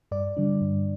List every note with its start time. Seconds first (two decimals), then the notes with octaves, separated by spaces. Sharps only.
0.11 G2 D5
0.37 D3 G3 D4
0.61 G2